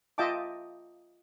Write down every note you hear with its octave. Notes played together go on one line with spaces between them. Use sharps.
F4 D#5 E5 G5 A5 D6